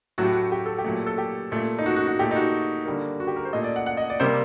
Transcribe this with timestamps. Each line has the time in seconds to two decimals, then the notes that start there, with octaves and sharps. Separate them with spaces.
0.18 A2 F#3 A3 F#4
0.24 G4
0.32 F#4
0.52 G4
0.66 A4
0.78 G4
0.84 A#2 F#3 A3
1.07 A4
1.18 G4
1.52 A#2 A3
1.79 D#4
1.86 F#4
1.96 F#4
2.07 F#4
2.19 A#2 A3 G4
2.31 D#4
2.36 F#4
2.85 D3 G3 A#3
3.20 F#4
3.27 G4
3.36 A#4
3.45 C5
3.53 A#2 A3 D#5
3.64 D5
3.76 F#5
3.86 F#5
3.97 D#5
4.10 D5
4.20 C3 G3 A#3 C5